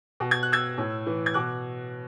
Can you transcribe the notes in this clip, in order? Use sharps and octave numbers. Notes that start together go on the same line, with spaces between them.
B2
G#6
F#6
E6 G#6
A2
E3
G#6
B2 D6 F#6